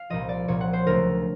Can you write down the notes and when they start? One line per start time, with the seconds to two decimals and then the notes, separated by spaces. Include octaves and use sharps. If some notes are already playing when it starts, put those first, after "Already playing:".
Already playing: F5
0.10 C2 A#2 F3 D#5
0.29 D5
0.48 C2 A#2 F3 C#5
0.61 F#5
0.73 C5
0.86 D2 C#3 F#3 A3 A#4